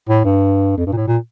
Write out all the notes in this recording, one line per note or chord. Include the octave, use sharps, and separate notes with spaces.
A2
G2
F2
G2
A#2
A2
A#2